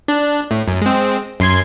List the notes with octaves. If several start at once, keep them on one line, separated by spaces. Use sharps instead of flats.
D4
A2
F#2
G#3 C4
F#2 C6 G#6